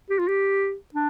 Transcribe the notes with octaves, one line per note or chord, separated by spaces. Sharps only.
G4
F4
G4
D4